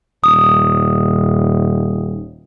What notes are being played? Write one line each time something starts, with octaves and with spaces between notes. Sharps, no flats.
D#1 D#6